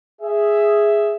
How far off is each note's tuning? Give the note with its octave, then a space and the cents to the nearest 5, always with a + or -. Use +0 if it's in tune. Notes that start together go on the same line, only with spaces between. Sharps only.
G#4 +0 E5 +0